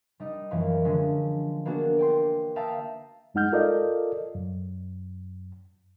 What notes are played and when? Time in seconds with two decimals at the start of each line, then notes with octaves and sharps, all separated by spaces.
0.20 G3 D#4 D#5
0.51 F#2 E3 F3 A#3
0.85 D3 F3 G#3 C#4
1.65 A#3 B3 D4 F#4 G#4
1.99 D5 G5 C6
2.56 E5 F5 G5 A5 A#5 D#6
3.34 F#2 G#3 D#4 F#5 F6 G6
3.52 F4 A4 A#4 D5 D#5 F5
4.35 F#2